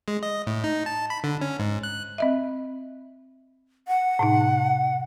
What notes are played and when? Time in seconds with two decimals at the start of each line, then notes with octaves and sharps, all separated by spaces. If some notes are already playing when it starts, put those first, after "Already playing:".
0.08 G#3
0.23 D#5
0.47 A2
0.64 D#4
0.86 A5
1.10 B5
1.24 D3
1.41 C#4
1.59 G#2
1.83 F#6
2.18 C4 D#5 E5
3.88 F#5
4.19 A2 C3 D#4